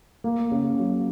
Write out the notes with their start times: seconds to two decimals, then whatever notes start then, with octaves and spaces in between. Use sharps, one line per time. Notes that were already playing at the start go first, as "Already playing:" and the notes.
0.24 A#3
0.51 C#3
0.79 F#3